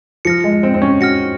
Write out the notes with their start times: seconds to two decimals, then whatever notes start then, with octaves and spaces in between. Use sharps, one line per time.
0.25 F3 F6 A#6 C#7
0.44 G#3
0.63 C4
0.74 C4
0.82 C#4
1.01 F#4 F6 A#6 C#7